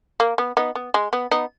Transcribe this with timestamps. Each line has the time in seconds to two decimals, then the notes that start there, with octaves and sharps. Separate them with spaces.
0.20 A#3
0.38 B3
0.57 B3 D#4
0.75 B3
0.94 G#3
1.13 B3
1.31 B3 D#4